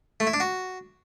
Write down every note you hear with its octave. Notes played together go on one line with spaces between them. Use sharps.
A3
E4
D4
F#4